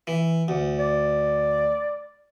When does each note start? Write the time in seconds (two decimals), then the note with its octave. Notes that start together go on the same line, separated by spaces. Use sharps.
0.07 E3
0.48 D2
0.79 D5